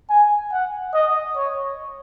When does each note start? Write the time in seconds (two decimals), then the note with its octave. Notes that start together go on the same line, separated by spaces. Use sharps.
0.10 G#5
0.53 F#5
0.94 D#5
1.36 C#5